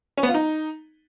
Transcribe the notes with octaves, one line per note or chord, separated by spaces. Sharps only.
C#4
B3
F4
D#4